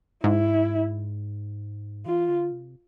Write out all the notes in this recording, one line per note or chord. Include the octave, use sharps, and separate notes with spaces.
G#2 E4
E3 F4
D3
C3